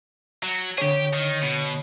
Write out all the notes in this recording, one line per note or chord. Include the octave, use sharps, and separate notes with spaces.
F#3
D3 G4 G#4 C#5
D#3
B2